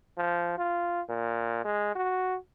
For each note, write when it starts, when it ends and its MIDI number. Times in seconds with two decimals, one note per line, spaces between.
0.17 0.58 53
0.58 1.02 65
1.09 1.62 46
1.65 1.95 56
1.95 2.36 66